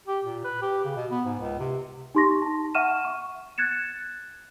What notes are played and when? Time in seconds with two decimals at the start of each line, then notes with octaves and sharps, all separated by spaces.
0.07 G4
0.25 A#2
0.44 B4
0.62 G4
0.85 C#3
0.96 B2
1.11 B3
1.26 G#2
1.39 C#2
1.60 C3
2.15 D#4 G4 C6 C#6 A#6
2.42 A5
2.75 E5 F#5 C#6 F6 D#7 E7
3.05 C#6
3.58 F#6 G#6 A6 C#7 E7